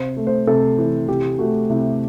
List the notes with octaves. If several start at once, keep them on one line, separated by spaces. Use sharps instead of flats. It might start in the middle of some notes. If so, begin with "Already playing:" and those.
Already playing: C3 C5
A3
C5
C3 A4
E3
C3 G4
A3 F#4
C3 E4